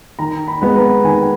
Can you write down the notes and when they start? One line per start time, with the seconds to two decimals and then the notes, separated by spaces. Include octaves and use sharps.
0.19 D#3 A#5
0.47 B5
0.62 G#3 B3
0.76 A#5
1.04 D#3 G#5